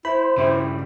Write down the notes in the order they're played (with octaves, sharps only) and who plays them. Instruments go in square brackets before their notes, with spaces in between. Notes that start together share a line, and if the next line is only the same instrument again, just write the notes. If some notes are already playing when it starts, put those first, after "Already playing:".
[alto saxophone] E4 [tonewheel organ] C5 [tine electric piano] B5
[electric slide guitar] G2 C#3 G3 [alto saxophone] E4